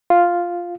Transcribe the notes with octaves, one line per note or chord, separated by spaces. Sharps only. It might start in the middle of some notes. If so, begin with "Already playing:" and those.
F4